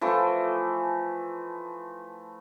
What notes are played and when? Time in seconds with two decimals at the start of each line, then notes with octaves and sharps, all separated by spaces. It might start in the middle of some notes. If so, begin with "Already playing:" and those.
0.01 E3 F3 A3